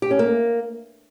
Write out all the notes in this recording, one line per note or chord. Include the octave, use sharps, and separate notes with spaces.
G4
C#4
A#3